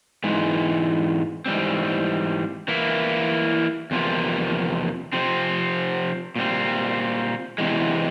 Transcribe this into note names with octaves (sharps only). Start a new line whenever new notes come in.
G#2 E3 G#3
G#2 E3 G3 C4
E3 A#3 E4
E2 C3 F3 A#3
C3 F3 C4
A#2 G3 C4
E2 C3 E3 G#3